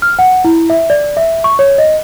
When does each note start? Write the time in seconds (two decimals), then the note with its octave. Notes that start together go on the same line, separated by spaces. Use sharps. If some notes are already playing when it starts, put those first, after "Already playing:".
0.02 F6
0.19 F#5
0.45 E4
0.70 E5
0.90 D5
1.17 E5
1.44 C#6
1.59 C#5
1.78 D#5